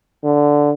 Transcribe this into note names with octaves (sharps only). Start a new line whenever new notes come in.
D3